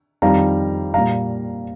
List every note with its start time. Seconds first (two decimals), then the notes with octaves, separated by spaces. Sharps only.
0.22 F2 D#3 G3 F5 A#5
0.94 A#2 G3 F5 A#5